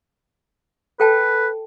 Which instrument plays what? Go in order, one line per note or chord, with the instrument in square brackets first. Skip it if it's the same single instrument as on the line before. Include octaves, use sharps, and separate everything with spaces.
[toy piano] A4 G5 A5 [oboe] B4